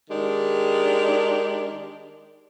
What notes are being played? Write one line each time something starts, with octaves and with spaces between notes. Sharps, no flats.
D#3 G#3 D4 G4